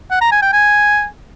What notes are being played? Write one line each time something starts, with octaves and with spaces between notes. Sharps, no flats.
F#5
A#5
G#5
G5
G#5